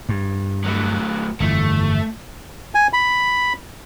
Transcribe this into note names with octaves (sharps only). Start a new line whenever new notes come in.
G2
F#3 A3
G1 F2 E3 A3
G#5
B5